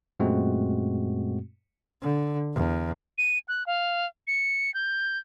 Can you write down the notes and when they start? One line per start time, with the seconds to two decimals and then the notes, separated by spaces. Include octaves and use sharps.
0.19 F#2 A#2 G#3 A3 C4 F#4
2.02 D3
2.54 E2
3.18 D#7
3.48 F#6
3.67 F5
4.27 C#7
4.74 G6